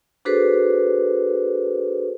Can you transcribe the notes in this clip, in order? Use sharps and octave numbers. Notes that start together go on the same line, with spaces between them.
D4 F#4 G#4 A4 B4 C5